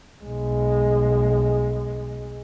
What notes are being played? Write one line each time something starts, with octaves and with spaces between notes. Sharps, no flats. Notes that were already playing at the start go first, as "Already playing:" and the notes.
B1 G#3